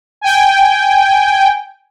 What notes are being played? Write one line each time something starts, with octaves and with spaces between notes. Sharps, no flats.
G5 G#5